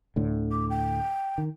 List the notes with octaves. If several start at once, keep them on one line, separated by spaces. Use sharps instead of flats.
D2 A2 D3
D6
G5
D#3